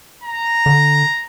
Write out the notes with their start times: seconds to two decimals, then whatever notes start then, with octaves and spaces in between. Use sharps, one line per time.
0.24 A#5
0.66 D3